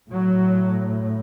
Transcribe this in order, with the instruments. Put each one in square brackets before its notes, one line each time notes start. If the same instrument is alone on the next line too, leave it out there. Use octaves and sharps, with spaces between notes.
[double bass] A2 [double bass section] F#3